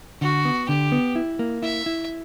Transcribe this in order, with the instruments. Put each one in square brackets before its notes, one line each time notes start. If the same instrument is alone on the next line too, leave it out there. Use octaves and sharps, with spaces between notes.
[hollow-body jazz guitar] D3 [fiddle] F#4
[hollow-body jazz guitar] B3
[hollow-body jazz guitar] D3 [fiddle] G4
[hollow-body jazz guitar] B3
E4
A#3
[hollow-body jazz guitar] E4 [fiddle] E5
[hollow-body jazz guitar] E4